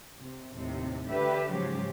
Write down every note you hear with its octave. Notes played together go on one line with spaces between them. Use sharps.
C3
D#2 A2 C3
D2 D3 G4 B4 E5
G#2 C#3 F3 F#3 G4